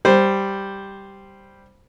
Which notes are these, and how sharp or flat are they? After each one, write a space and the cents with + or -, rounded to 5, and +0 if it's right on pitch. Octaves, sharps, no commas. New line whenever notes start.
G3 +0 C5 +0